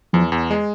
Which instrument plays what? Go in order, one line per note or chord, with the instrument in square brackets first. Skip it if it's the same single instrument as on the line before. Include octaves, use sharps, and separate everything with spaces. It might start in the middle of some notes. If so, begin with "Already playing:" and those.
[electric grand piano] E2 [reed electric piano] F3
[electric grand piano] E2
G#3